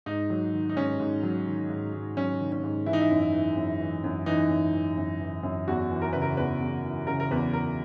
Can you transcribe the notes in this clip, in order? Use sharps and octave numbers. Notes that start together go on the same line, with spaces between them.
G#2 D#4
F#3
D#3
D#4
G#2 C#4
G#2
F#3
D#3
G#2
G#2
F#3 C#4
D#3
C#4
G#2
E3 E4
D#4
E4
F#2
E4
E3
F#2
E3
F#2
E3 D#4
F#2
E3
F#2
E3
F#2
E2 F#4
E3
A#4
C#3 B4
A#4
E2 B4
E2
E3
C#3 A#4
A#4
E2 B4
E2 A#4